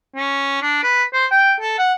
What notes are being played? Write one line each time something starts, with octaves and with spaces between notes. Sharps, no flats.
C#4
D4
B4
C5
G5
A4
F#5